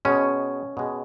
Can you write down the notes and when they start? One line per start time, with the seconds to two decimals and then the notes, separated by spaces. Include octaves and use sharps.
0.05 B2 G#3 C#4
0.77 B2 G#3